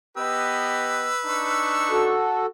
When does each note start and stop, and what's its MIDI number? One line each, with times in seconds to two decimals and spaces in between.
0.17 1.11 59
0.17 1.11 67
0.17 2.10 71
0.17 1.11 75
0.17 2.10 88
1.25 2.16 62
1.25 2.16 63
1.25 2.16 85
1.90 2.46 66
1.90 2.46 69